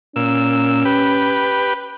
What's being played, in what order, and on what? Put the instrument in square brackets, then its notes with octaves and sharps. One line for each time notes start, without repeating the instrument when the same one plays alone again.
[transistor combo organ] A#2 E6 [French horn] C#4
[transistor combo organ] G4 B4